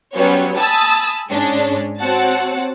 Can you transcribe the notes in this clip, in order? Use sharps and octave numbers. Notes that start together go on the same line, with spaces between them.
F#3 G3 B3 C#4 C5 C#5
G#5 A5 B5 D#6 E6 A6
G#2 G#3 C#4 D4
C4 F#4 C#5 F#5 A5